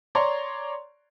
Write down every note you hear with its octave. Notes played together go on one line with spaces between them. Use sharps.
C#5 D5 A#5 C6 C#6